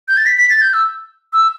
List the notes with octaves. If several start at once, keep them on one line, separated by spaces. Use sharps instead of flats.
G6
A6
B6
B6
A6
G6
E6
E6